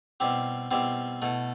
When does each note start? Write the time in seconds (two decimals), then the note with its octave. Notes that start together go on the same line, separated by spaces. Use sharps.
0.20 B2 G3 C4 E4 G4
0.71 B2 G3 C4 E4 G4
1.22 B2 A3 E4 A4